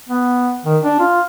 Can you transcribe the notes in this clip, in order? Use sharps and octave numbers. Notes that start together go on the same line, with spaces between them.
B3
D#3
D4
F4